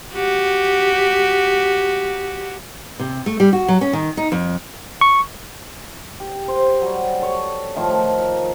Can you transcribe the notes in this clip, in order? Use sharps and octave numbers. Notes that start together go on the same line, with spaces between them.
F#4 G4
C3
A3
G3
F#4
F#3
C#4
D#3
D#4
F2
C#6
G4
C5
F#3 G3
A4 C#5
A2 D#3 F3
A#4